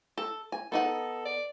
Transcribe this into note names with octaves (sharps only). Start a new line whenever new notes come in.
A4
G#5
B3 D#4 A4 F#5
A4
D5